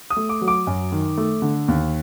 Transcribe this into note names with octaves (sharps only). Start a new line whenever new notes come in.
D#6
A3
D6
F#3
D6
F#2
D#3
A3
D3
D#2